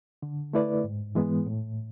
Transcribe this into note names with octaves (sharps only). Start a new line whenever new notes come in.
D3
A3 E4 B4 D5
G#2
E3 G#3 B3
A2